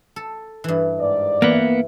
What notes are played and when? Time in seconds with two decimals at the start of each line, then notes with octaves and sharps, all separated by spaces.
0.16 A4
0.64 G2 E3
1.00 G#2 D5
1.42 E3 A#3 B3